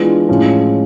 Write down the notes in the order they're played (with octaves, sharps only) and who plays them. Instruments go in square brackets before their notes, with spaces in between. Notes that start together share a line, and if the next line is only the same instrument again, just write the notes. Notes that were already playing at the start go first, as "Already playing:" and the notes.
Already playing: [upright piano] E3 G#3 B3 D4 F4
A2 F3 G#3 C#4